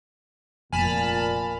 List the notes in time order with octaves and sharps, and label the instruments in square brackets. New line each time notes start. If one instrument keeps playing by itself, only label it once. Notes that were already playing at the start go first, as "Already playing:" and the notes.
[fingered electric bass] F1 [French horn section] A#2 [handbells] G#5 [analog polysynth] A5 B5 F6